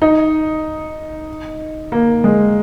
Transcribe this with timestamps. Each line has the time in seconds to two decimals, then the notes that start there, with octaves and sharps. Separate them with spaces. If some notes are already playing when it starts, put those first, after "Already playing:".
0.02 D#4
1.92 A#3
2.24 G#3